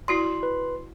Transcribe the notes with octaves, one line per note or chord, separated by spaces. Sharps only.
E4 F#4 D5 C6
B4